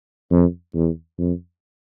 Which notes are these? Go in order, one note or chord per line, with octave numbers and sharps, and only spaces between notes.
F2
E2
F2